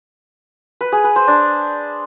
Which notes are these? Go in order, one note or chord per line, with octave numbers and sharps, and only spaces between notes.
B4
G#4
B4
C5
D4